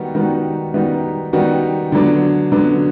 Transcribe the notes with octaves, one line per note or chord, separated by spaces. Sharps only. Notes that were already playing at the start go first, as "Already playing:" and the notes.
Already playing: D#3 G3 B3 D#4 F#4
D#3 G3 B3 D#4 F#4
D#3 G3 B3 D#4 F#4
D#3 G3 B3 D#4 F#4
D3 F#3 B3 D4
D3 F#3 B3 D4